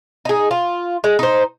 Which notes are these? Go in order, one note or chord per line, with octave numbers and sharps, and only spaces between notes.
D#4 G#4
F4
G#3
D#4 C5